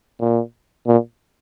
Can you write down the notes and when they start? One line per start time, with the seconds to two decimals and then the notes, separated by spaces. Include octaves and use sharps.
0.20 A#2
0.87 A#2